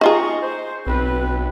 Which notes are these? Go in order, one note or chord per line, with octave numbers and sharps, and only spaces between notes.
D#4 F4 G#4 A#5 C#6
C5
B1 C4 B4